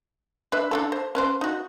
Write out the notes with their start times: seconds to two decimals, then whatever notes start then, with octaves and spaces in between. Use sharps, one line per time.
0.52 D4 B4 E5
0.71 D4 E4 A4
0.92 C5
1.15 C#4 B4 C5
1.41 D#4 F#4